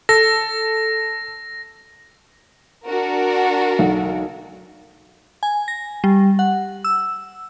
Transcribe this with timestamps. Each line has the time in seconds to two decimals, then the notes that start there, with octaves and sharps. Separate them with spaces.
0.09 A4 A#6
2.86 D4 F#4 A#4
3.79 B1
5.43 G#5
5.68 A#6
6.04 G3
6.39 F#5
6.84 E6